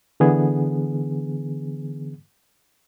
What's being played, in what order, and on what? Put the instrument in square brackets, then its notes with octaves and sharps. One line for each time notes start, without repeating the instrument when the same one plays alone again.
[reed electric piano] D3 E3 B3 G#4